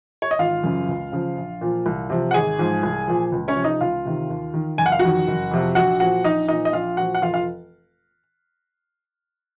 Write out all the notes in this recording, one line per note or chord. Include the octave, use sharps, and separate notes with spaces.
C#5
D#5
G#1 F4 F5
F#2 C#3 F3
C#2
C#3 F3
A#1
A#2 F3
C2
C3 F3
F#5
G#1 G#4 G#5
G#2 F3
C2
A#2 F3
C#2
C#4 C#5
C3 F3
D#4 D#5
C#2 F4 F5
C3 D#3
D#2
D#3
F#1 G#5
F#5
F5
F2 D#3 F#4 F#5
F#1
F2 C3 F3
A#1 F#4 F#5
A#2 F3 F#4 F#5
A#1 D#4 D#5
A#2 F3 D#4 D#5
D#5
A#1 F4 F5
A#2 F3 F#4 F#5
F#5
F1 F4 F5
F4 F5